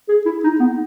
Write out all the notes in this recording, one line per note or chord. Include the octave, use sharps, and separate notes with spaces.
G#4
E4
D#4
B3